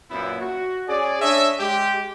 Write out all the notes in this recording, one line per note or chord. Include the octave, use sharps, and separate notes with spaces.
F#2 A#2 B3 E4
F#4
C#4 G#4 D5
D4 C#5 D#5 E5
G#3 G4